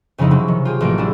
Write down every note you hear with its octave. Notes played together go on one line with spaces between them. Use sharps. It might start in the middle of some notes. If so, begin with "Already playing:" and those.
F2 C#3 F3 C4 D#4 E4
C3 F#3 C4 C#4
D#3
F4 G4 G#4
A1 F3 A#3 D7
F#3 G3 D4 E4 G#4